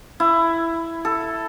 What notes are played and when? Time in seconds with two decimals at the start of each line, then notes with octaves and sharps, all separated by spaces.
0.20 E4
1.05 A4